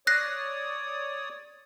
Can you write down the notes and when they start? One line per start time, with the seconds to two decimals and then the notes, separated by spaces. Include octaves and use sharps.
0.07 C#5 D5 D#6 F#6 A#6 C7